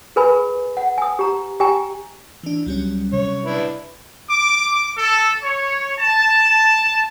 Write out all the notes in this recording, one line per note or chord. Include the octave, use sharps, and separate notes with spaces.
G#4 A#4 B4 G#5 B5
F#5
G#5 D#6
G4 A#5
G4 G5 G#5 A#5
E3 D4
C#2 F#3 G3 C#4
C3 C#5
D4 E4 B4
D6
A4
C#5
A5